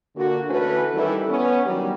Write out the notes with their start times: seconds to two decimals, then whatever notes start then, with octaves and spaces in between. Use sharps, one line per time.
0.16 A#2 D3 F#4
0.49 D3 E3 A3 C#4 F#4 B4
0.94 D#3 E3 G3 C#4 E4 A4
1.29 B3 C#4
1.65 D#3 E3 F#3 G3